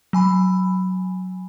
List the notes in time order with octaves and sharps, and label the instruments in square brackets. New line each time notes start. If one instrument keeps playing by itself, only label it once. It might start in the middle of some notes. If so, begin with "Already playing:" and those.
[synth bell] F#3 G#5 B5